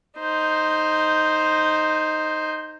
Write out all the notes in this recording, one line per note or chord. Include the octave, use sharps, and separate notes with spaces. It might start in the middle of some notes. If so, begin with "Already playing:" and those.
D#4 C5